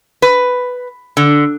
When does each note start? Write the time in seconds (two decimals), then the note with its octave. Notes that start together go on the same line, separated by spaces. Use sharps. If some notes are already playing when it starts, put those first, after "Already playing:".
0.22 B4
1.17 D3